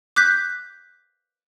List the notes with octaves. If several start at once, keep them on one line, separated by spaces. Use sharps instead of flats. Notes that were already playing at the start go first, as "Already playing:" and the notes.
D6 F#6 G6 B6